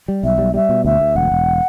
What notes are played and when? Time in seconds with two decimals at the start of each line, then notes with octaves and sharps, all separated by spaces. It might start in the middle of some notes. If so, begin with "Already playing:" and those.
0.08 G3
0.23 B1 E5
0.38 G3
0.54 G3 E5
0.69 B2
0.85 D2 E5
1.00 D2
1.16 E1 F#5
1.31 E1